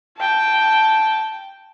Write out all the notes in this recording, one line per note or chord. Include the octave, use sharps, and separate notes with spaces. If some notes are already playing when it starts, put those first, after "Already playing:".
G5 A5